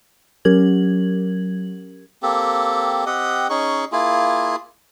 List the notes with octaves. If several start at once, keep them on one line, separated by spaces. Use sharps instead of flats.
F#3 C#4 G4 A#4 G#6 F#7
A#3 C4 G4 A4
C4 G4 D#5 F#5
C#4 D#4 G#4 C#6
A#3 E4 F4 G#4